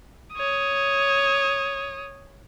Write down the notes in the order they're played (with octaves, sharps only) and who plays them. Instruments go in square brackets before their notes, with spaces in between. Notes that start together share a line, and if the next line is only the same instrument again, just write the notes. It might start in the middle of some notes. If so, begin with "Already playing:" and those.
[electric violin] C#5 D#6